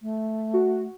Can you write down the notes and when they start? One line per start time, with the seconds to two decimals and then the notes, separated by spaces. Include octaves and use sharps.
0.01 A3
0.54 F#4